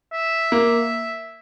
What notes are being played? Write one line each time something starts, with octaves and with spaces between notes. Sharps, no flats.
E5
A#3